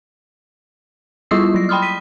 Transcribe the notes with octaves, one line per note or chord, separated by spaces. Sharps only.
G3 E4 F4 D#6 E6 C7
F#3 A#6
G5 B5 C6 D#6 F6
B6 D#7